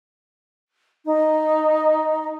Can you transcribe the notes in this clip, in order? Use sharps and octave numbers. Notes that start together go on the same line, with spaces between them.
D#4